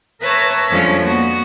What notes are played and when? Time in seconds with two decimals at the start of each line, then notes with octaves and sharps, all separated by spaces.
0.21 A#4 B4 C#5 E5 A5 A#5
0.71 F2 F3 G3 G#3 C#4 D4
1.01 A#3 B3 F#4